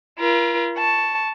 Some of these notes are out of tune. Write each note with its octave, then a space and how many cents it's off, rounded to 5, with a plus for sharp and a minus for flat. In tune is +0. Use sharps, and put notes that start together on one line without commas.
F4 -35 A#4 +35
A5 +0 C#6 +0